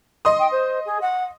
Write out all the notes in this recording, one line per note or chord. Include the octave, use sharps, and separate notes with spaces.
D#5 C6 D#6
G5
C5
G#4
F#5